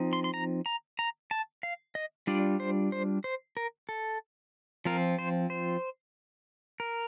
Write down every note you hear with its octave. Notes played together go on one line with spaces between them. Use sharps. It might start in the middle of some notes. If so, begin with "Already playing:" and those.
Already playing: F3 C4 D#4
C6
C6
A#5
A#5
A#5
A5
F5
D#5
G3 D4 F4 D5
C5
C5
C5
A#4
A4
F3 C4 F4 A#4
C5
C5
A#4